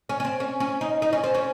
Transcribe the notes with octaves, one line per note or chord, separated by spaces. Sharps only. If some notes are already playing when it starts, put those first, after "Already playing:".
C#4
C#4
C4
C#4
C#4
D#4
D#4
C#4
C4
C#4